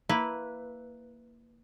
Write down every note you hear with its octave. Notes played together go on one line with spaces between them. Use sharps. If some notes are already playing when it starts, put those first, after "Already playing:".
A#3 E4 B4